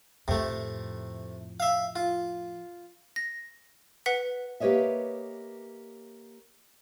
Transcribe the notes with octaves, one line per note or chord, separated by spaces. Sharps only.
F2 A2 C3 A3
E5 F5
F4
A#6
B4 F#5 B6
A#3 G4 B4 C#5 D#5 E5